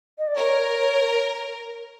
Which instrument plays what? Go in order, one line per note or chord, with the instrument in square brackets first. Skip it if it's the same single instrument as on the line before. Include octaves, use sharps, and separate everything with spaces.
[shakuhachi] D#5
D5
[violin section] A#4 [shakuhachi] C#5